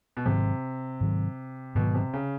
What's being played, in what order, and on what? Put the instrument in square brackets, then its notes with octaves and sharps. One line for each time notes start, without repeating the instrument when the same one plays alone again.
[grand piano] B2
[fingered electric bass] G#2 D#3 F#3 [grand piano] C3
[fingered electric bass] G#2 D#3 F#3
[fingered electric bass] G#2 D#3 F#3 [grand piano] B2
[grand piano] C3
C#3